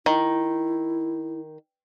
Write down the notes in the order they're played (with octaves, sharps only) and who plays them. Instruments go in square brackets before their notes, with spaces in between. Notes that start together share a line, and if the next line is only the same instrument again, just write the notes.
[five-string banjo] D#3 [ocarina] E4